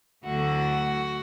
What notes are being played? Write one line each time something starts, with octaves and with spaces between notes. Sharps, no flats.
D2 D3 F#3 A3 E4 F#4